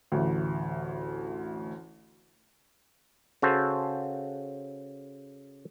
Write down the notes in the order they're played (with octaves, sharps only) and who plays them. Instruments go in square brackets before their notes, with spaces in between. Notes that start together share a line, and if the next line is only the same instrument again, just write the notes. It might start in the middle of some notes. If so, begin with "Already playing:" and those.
[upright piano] A1 D2
[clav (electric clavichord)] C#3 F#4 A4 C5